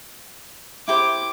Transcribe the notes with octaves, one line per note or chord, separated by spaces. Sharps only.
E4 G4 C5 D6